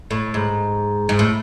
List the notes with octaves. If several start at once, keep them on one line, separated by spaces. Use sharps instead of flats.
A2
G#2
G#2
A2